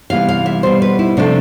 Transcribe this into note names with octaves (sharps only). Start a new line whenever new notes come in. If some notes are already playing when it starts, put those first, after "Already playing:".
C3 E3 G3 B3 F5
F5
E5
B2 G3 B3 C5
B4
E4
C3 F3 A3 D4